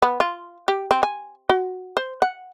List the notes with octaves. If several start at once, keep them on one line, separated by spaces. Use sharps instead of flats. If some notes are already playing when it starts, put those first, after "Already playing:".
B3
F4
G4
C4
G#5
F#4
C5
F#5